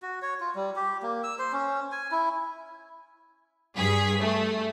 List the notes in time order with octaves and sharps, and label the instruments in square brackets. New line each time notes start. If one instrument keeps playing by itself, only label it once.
[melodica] F#4
C#5
F4
G3
G4
A#3
E6
C5
C#4
G#5
E4
[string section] G2 G#4 B6
A3